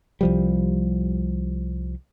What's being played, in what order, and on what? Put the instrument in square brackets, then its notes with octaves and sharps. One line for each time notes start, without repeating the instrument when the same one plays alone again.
[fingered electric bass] C2 F3 G3